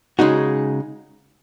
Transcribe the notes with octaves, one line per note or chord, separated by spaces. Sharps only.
C#3 G#3 D#4 F#4